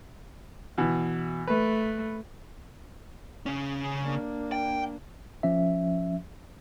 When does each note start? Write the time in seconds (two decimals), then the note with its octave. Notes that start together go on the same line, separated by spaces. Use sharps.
0.78 B2 E3
1.47 A3 B4
3.46 C#3 C#4
4.02 A#3 D4
4.52 G5
5.43 F3 C#4 E5